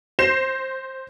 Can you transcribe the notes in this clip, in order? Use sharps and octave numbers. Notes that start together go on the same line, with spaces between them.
C5 G6 A#6 C7 E7